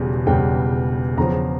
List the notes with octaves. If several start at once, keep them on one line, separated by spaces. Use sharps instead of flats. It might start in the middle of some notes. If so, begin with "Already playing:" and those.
Already playing: E1 E2 C#3 G3
E1 E2 C#3 G3 G5
E2 C#3 F3 A#5